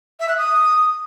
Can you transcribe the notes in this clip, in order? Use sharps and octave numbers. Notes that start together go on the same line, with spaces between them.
E5
F#6
D#6